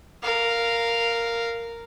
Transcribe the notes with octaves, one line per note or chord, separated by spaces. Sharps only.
A#4 F5